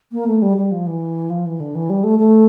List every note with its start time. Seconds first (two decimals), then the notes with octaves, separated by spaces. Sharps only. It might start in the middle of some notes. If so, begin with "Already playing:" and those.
0.12 A#3
0.27 A3
0.42 G3
0.57 G3
0.71 F3
0.87 E3
1.30 F3
1.46 E3
1.60 D3
1.75 E3
1.90 G3
2.04 A3
2.19 A3